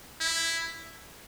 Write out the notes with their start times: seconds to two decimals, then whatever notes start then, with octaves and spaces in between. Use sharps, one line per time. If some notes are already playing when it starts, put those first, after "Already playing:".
0.20 E4